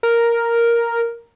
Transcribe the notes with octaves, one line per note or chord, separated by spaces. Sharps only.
A#4